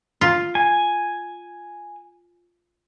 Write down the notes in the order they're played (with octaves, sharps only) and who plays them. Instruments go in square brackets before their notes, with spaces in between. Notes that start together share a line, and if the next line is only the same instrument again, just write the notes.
[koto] F4
[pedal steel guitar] G#5